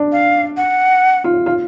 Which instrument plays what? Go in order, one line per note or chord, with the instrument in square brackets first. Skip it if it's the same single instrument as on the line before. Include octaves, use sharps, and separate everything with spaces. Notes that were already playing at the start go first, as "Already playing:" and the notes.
Already playing: [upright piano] D4
[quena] F5
F#5
[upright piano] F4
F4